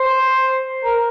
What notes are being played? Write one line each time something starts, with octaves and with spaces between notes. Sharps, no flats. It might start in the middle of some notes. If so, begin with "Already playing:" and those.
Already playing: C5
A#4